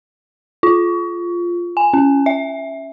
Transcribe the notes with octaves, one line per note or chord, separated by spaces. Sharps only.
F4
G#5
C#4
E5